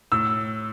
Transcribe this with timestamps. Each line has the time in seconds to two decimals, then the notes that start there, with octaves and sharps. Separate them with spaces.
0.12 A2 E6